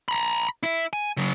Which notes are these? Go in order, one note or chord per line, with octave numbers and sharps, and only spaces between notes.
A#5 B5
E4 E5
G#5
C#3 F#3